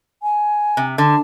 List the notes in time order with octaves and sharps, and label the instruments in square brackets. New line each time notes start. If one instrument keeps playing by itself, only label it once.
[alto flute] G#5
[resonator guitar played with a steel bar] C3
[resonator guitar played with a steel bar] D3 [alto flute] A5